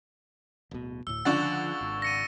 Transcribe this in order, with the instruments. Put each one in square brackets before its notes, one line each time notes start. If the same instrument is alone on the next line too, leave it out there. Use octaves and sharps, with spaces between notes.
[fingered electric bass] D1 B2
[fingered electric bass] D2 A2 [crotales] E6
[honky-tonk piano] C#2 D4 F#5 [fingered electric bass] D3 F3 [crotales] C#6 A6
[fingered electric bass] G#1
[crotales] A#6 C#7 D#7